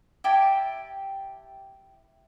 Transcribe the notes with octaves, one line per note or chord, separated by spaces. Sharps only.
E4 G4 G5 A5